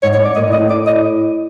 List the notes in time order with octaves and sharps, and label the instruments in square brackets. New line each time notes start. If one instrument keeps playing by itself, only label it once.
[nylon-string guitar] G#2 [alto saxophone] C#5
[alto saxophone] C#5
[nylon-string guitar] G#2 [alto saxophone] D5
[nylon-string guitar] A#2 [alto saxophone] D#5
[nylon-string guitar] A2
[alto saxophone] D#5
[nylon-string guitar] A2
[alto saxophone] D5
D#5